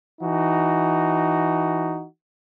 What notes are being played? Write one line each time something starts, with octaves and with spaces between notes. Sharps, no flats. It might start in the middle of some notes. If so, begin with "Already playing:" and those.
E3 D#4 F#4